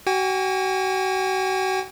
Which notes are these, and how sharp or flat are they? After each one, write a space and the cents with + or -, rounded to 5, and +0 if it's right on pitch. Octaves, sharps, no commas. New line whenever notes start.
F#4 +35 G#5 -40